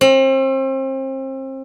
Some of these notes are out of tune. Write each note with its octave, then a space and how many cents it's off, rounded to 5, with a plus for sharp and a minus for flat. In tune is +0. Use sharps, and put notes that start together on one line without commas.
C4 +35